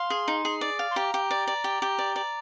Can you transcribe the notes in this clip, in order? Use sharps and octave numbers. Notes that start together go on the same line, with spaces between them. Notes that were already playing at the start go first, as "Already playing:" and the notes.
Already playing: F5 C6
G#4
D#4
G#4
D5
F5
C6
G4 A#5
G4
D5
D5
G4
G4
D5
D5